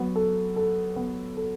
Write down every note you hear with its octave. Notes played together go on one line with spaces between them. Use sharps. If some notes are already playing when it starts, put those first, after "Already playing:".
Already playing: F#3 B3
A4
A4
B3
A4